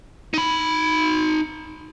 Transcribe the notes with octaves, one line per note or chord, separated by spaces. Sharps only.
D#4 B5